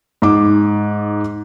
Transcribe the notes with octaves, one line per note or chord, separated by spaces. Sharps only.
G#2 D6